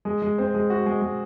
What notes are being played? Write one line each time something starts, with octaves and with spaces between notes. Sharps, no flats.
G#3
G#3
C4
G#3
F#4
G#3
G#3